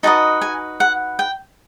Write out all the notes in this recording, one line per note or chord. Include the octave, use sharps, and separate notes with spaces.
D#4 F#4 B4 D#5 A5
G#5
F#5
G5